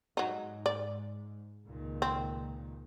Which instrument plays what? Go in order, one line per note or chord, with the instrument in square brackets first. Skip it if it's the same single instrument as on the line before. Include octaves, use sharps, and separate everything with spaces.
[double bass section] G#2 [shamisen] F#3 D#4
[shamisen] D5
[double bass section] C#2 A#2 D#3
[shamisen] C4